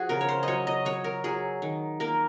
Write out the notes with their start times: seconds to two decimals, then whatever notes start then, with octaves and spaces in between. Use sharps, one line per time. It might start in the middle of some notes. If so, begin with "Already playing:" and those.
Already playing: F3 F#4 G#4
0.09 C#3 A#4
0.21 C#5
0.29 C5
0.43 F#3 C#5 D#5
0.67 D#5
0.85 F#3 C#5
1.04 A#4
1.24 F#3 G#4
1.62 D#3
2.00 A#3 A#4